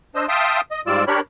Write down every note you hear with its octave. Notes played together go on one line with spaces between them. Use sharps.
D4 C5 D#5 E6
E5 F5 G5 A5 C6 D#6
D#5
G#2 G3 F4 D5 E6
D4 G4 A#4 C#5 B5